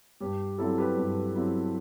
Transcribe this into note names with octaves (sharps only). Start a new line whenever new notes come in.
G2 G4
F#3 C4 E4 A4
G4 B4
G2
F#3 C4 E4